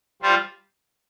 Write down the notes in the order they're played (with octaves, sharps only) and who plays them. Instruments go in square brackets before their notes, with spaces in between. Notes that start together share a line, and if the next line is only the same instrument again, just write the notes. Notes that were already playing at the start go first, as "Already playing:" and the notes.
[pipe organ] G3 F4 C5